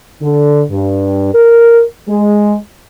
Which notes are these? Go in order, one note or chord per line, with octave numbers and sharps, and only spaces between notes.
D3
G2
A#4
G#3